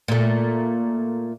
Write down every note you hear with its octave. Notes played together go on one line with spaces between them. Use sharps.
A#2 A3